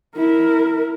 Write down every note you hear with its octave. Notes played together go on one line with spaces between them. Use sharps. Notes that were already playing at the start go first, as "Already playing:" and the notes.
E4 A#4